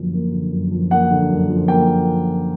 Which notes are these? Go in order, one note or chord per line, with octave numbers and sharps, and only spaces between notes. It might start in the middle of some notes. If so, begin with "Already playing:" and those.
Already playing: F#2 D3 F3 A#3
A#3
D3
F#2
F3
A#3 F#5
D3
F#2
F3
A#3 G5